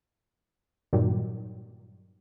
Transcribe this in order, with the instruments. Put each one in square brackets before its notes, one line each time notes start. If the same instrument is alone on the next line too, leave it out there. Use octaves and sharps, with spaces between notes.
[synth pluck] G2 A#2 D#3 F#3 G3